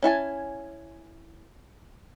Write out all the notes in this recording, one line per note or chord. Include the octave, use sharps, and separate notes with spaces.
C#4 E4 G#5 A5